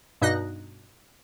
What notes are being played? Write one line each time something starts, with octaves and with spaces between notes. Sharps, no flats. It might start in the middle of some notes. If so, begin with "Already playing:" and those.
G2 B2 D#4 D#5 F#6 A#6